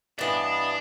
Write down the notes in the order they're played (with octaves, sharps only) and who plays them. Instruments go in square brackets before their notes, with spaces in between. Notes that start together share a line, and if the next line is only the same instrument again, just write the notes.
[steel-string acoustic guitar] G2 E3 [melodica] B3 D#5 [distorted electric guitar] D4